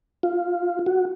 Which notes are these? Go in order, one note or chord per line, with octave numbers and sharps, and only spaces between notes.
F4
F#4